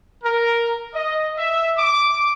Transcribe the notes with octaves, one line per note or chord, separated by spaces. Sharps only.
A#4
D#5
E5
D6